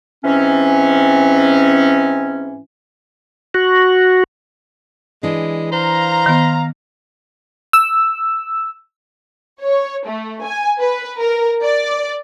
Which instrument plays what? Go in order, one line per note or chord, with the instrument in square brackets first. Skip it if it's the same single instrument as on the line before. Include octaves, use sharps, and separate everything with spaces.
[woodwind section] G#2 E3 C4 C#4
[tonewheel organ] F#4
[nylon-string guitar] E3 D4 [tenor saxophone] G#3
[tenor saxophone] C5 [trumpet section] F5 A#5
[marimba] D#3 B3
[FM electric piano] E6
[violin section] C#5
A3
G#5
B4
A#4
D5